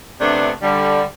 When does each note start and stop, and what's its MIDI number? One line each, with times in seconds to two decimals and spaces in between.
0.21 0.51 48
0.21 0.51 57
0.21 0.51 59
0.21 0.51 62
0.62 1.02 50
0.62 1.02 55